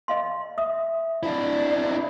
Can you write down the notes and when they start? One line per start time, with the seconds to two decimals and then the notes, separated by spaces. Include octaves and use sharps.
0.08 D#5 F5 C6
0.58 E5 D#6
1.23 D4 E4